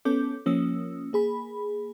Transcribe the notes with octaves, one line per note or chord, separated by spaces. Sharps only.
B3 C#4 A4 D6 G6
F3 A#3 C#4 D#6 E6
A#3 G#4 B5